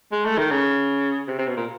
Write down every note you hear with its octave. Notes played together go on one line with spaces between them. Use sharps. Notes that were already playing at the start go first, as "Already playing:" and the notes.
G#3
A3
D#3
C#3
C3
C3
B2
A#2